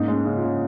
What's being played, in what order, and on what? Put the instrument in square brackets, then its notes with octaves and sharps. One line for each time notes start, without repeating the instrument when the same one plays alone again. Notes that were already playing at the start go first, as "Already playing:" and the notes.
Already playing: [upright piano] G#2 D#4 [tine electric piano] A#3 C#4
[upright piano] G#3
[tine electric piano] C#4
[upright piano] C#3
[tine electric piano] F4
[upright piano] C#3